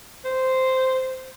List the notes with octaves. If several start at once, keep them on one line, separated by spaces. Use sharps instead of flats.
C5